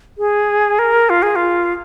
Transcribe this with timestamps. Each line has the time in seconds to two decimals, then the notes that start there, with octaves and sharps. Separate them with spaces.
0.18 G#4
0.79 A#4
1.10 F4
1.23 G#4
1.36 F4